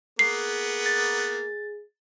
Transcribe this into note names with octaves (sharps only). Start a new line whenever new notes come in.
A#3 B3 G#4 C7
A6